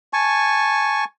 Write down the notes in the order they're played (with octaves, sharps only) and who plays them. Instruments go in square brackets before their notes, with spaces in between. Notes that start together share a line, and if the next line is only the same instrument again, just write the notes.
[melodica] G#5 A5 C#6